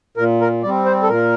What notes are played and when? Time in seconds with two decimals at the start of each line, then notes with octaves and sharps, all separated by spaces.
0.17 A#2 A#4
0.41 A#4
0.63 G3 C4 D5
0.86 C5
1.03 A4
1.09 A#2 A#4